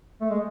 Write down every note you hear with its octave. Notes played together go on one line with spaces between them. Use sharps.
A3
G#3